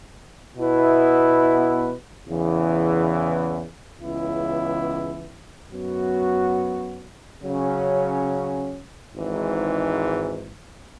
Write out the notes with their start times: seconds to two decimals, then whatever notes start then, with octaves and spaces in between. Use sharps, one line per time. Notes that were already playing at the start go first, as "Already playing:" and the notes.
0.56 B2 B3 E4 B4
2.28 E2 C#3 E3
4.00 C#2 C#3 E3 B3 E4
5.71 F#2 F#3 B3 F#4
7.43 C#3 F#3 C#4
9.15 G#1 G#2 E3